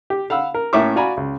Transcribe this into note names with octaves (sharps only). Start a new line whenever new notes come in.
G4
F5 F#5 B5 E6
A#4
A2 A#3 C#4 E5 C#6 D6
F#4 D5 F5 G#5 A#5 B5
C#2